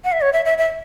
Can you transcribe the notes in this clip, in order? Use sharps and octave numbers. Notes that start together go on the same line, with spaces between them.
F#5
E5
C#5
E5
E5
E5